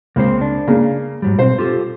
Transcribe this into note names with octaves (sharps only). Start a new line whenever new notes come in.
C#2 A#3 C4 C5
D4
C#3 A#3
G#2 F#3 G3
B2 C4 C5
F4 G4 A4